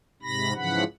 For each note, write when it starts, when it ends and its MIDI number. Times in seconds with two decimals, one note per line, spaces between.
0.22 0.53 44
0.22 0.53 48
0.22 0.53 83
0.22 0.53 94
0.55 0.84 44
0.55 0.84 49
0.55 0.84 52
0.55 0.84 53
0.55 0.84 78
0.55 0.84 83